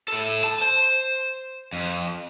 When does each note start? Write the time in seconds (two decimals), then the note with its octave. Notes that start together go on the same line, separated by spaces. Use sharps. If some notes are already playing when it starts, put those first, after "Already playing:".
0.08 E4 A4
0.44 A5
0.61 C5
1.73 F2